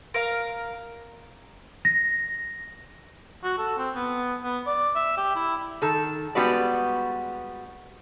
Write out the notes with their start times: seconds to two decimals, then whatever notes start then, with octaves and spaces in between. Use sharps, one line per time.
0.14 A#4 F5
1.85 A#6
3.44 F#4
3.58 A4
3.78 C4
3.95 B3
4.43 B3
4.66 D5
4.95 E5
5.17 G4
5.35 E4
5.82 D#3 A4
6.35 G3 G#3 B3 F#4 B4 D5